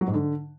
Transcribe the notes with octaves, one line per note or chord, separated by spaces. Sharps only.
F#3
G#2
D3